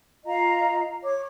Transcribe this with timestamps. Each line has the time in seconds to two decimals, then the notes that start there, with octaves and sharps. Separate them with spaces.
0.25 F4 D#5 F5 A#5
1.03 C#5 D6